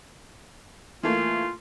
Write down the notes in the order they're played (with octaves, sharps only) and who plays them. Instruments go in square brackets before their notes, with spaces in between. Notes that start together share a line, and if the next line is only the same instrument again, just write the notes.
[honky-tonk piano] E3 A3 A#3 [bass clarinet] F4